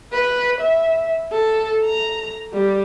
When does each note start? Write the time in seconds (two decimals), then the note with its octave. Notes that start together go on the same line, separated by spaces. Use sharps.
0.13 B4
0.61 E5
1.32 A4
1.85 A#5
2.53 G3